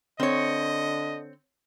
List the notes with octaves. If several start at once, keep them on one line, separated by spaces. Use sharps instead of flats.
D3 C4 C#5 D#5